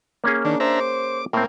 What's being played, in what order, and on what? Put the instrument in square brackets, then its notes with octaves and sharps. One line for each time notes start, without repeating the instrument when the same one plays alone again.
[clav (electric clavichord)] A#3 C#4 G#4
[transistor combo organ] D#3 [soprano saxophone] D4
[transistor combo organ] D4 E5 A#5 [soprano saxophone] C5
[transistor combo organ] D6
[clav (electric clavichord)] A2 C4 [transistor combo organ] A#3